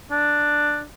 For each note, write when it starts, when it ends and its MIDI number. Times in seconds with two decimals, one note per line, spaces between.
0.11 0.83 62